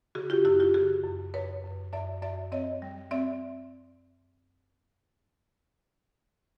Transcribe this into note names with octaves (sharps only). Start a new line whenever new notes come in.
C#3 F#4 G#4
F4 G4
F#2 E4 F#4
F4 G4
C#3 F#4 G#4
F#2
F#2 B4 C#5
F#2
F#2 D5 E5
F#2 D5 E5
C4 C#5 D#5
G3
C4 D5 E5